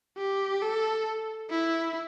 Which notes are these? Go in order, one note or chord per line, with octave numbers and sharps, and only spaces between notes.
G4
A4
E4